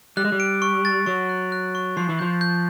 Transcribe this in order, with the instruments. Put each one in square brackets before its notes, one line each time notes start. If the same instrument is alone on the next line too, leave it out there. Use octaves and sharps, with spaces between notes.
[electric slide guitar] G3 [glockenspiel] F#6
[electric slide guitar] G#3
G3
[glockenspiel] D7
C#6
A6
[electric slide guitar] F#3 [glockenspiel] C#6
[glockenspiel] F#6
F#6
C#6
[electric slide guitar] F3 [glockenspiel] C7
[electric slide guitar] E3
[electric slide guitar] F3 [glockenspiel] G6
[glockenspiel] G6